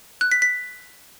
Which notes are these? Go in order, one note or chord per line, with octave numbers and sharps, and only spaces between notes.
F#6
B6
B6